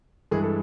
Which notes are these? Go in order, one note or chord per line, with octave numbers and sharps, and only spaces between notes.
G2 E3 G#3 G#4
A4